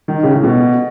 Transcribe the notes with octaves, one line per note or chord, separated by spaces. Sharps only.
D#3
C#3
A2
B2